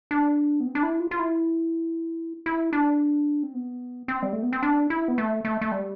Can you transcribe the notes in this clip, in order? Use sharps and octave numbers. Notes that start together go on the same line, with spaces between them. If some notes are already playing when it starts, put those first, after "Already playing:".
D4
B3
C4
D4
E4
F4
F4
E4
E4
D4
C4
B3
C4
G3
A3
B3
C4
D4
E4
B3
A3
A3
A3
G3